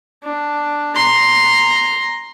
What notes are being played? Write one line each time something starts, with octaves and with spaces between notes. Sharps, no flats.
D4
A#5 C6